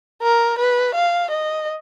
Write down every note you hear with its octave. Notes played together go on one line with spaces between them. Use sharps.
A#4
B4
F5
D#5